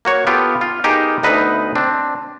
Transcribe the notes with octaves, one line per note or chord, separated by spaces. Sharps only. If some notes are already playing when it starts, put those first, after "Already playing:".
A#3 F#4 C#5
B3 F4 G4 A4
F4
B3 D#4 G4 G#4 A#4
D2 B3 D#4 B4 E5
C4 D4